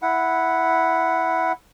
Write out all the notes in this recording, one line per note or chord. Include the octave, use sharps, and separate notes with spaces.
E4 F#5